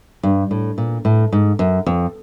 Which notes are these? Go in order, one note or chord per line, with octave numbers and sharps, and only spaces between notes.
G2
A2
A#2
A2
G#2
F#2
F2